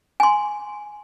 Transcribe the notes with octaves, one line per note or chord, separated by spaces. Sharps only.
G#5 C6